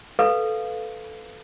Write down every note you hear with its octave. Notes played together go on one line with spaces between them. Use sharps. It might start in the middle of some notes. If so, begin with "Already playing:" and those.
A4 B4 F5